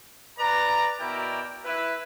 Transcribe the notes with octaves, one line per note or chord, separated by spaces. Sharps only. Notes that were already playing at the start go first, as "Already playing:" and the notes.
B4 D5 A#5
B2 E4 A#4 D5 G5
E4 B4